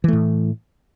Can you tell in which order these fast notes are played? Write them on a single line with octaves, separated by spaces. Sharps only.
E3 A3 A2